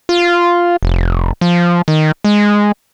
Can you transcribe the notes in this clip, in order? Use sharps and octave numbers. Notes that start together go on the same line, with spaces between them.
F4
F1
F3
D#3
G#3